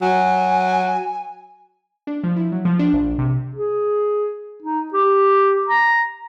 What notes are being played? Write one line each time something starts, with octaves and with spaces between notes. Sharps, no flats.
F#3 G#5
D4
F3
E4
F#3
F3
D4
A#1
C3
G#4
D#4
G4
A#5